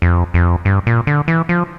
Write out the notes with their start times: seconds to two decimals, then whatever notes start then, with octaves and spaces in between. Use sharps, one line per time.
0.02 F2
0.34 F2
0.65 G2
0.87 A#2
1.07 D3
1.28 E3
1.49 F3